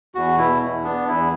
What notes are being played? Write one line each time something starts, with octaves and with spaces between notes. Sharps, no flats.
E2 F#4
B2 E4
E2
B3 D4
E2 E4